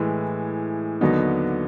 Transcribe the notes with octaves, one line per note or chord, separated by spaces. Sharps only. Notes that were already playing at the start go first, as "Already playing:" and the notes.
Already playing: A2 E3 G#3
D#2 D3 F#3 B3 D#4